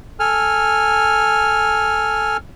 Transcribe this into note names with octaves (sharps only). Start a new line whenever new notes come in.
A4 G#5 F6